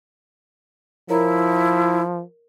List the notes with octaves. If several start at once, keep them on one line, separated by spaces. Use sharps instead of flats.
F3 E4 A#4 C#5 A#5